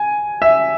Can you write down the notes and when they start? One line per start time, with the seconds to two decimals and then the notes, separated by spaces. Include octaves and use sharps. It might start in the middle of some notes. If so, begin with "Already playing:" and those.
Already playing: G#5
0.42 E5